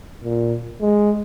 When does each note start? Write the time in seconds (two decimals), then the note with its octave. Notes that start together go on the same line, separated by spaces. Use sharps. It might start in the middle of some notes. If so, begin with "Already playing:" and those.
0.24 A#2
0.81 G#3